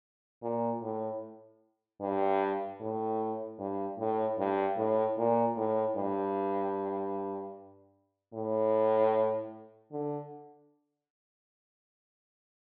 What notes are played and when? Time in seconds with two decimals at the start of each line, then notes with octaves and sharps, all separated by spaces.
0.42 A#2
0.82 A2
2.01 G2
2.80 A2
3.59 G2
3.98 A2
4.38 G2
4.77 A2
5.17 A#2
5.57 A2
5.96 G2
8.33 A2
9.92 D3